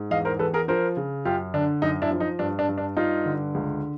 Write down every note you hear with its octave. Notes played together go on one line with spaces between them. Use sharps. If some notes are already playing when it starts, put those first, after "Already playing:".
Already playing: G#2
E2 D#5 F5
A#4 C5
E2 A4 B4
G#4 A#4
F3 A#4 C5
C#3
F#2 F4 G4
D3 D4
F#2 D#4
D4 E4
F3
D#4
G2 D4
D4
G2
D4
G2 D#4 F4
D3
C#2